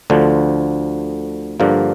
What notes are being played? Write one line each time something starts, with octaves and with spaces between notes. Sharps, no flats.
D2 D3 F3
G2 D3 F3 A#3